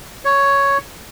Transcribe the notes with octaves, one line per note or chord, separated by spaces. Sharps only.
C#5